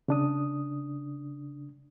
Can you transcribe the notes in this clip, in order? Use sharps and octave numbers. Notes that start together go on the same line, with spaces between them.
C#3 D4 D#6